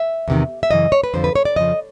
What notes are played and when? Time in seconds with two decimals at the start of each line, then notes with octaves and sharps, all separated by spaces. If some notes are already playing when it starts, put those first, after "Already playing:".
Already playing: E5
0.28 E2 C3 D#3
0.63 E5
0.71 F#2 C#3 E3 D#5
0.92 C#5
1.04 B4
1.14 F2 D3 F3 C5
1.24 B4
1.36 C#5
1.45 D5
1.56 F2 C#3 F3 D#5